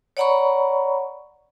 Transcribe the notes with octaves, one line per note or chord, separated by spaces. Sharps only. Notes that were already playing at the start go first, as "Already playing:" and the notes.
C#5 D5 F#5 A#5 B5 C#6